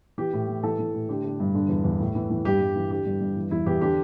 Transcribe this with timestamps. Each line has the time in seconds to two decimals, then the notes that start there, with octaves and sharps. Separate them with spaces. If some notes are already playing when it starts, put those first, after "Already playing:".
0.18 E3 G4
0.33 A2
0.48 E3
0.63 E3 A4
0.79 E3
0.94 A2
1.09 D3 G4
1.24 D3
1.40 G2
1.55 D3
1.69 E2
1.84 E2
2.00 A2
2.15 E3
2.30 E3
2.45 G2 G4
2.61 G2
2.76 E3
2.90 D3 G4
3.06 G2
3.21 G2
3.36 E3
3.51 E2 E4
3.66 E2 G4
3.81 D3 G4